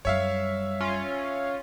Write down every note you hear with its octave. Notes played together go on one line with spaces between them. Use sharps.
F#2 G3 C#5 E5 F5
C#4 F4